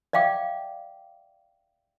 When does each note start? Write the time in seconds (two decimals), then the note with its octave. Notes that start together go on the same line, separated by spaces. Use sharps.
0.13 D5 E5 F5 G5 D6